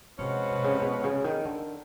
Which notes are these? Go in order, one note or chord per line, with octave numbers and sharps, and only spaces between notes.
C3 F3 G#3 C#4 F#4 B4
B2
C#3
C3
B2
C#3
D#3
D3